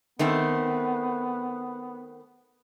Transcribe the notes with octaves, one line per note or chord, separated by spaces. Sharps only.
D#3 A3 B3 C4